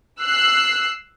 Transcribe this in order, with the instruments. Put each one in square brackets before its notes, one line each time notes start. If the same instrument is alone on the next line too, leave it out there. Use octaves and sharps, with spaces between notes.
[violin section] E6 F#6 C7